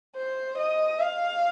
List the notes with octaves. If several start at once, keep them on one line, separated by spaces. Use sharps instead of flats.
C5
D#5
F5